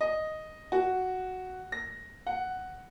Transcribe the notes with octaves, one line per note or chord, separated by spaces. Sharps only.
D#5
F#4
A#6
F#5